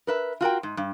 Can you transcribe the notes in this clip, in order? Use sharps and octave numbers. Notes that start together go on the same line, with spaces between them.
A#4 B4 E5
F4 F#4 A#4 G5
G#2
G2